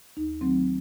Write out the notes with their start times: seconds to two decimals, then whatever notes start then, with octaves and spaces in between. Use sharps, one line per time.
0.17 D#2 D#4
0.41 D#3 F#3 A3 C4